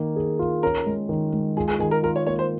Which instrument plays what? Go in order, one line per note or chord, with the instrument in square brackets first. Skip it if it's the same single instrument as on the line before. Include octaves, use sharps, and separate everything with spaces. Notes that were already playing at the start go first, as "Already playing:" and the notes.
Already playing: [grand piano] D#3 A#3
G#4
F4
[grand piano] C#4 [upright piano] A#4
[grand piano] G#3
D#3
G#3
[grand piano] F4 [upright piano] G#4
[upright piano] G#4
[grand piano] D#3 [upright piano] G#4
[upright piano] A#4
[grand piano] F4 [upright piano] A#4
[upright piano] C#5
[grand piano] A#3 [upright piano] C#5
[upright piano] C5